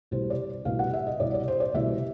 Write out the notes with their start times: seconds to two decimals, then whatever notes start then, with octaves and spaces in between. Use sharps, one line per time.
0.11 C2 B2 G3 C5
0.30 D5
0.65 C2 B2 G3 F5
0.79 F#5
0.94 E5
1.07 D#5
1.20 C2 B2 G3 D5
1.34 D5
1.48 C5
1.60 D5
1.74 C2 B2 G3 E5